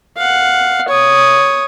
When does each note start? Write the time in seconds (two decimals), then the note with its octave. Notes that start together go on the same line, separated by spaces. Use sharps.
0.17 F5 F#5
0.88 C#5 D#6